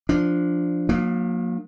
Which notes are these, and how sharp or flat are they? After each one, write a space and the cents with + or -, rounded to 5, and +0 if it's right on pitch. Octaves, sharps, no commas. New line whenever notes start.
F3 +0 D4 +0
F#3 -45 A#3 +0 D4 +45